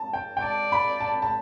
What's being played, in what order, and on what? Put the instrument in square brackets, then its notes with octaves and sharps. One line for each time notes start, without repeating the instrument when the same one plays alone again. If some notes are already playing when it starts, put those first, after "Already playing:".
Already playing: [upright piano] A5
G5
G5
[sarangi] D5 [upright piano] A5
[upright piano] B5
A5
A5